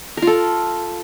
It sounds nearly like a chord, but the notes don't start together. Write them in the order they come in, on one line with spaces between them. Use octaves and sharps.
A#4 F4 A4